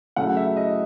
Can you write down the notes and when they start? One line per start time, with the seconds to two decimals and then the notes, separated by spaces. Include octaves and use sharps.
0.16 C#3 F#3 A3 F#5
0.37 E5
0.56 D#5